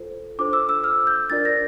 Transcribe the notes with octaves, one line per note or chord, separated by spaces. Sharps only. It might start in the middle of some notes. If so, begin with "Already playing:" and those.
Already playing: F4 A4 C5
D4 F4 A4 C5 D6
E6
E6
F6
G6
D4 F4 A#4 D5 A6
A#6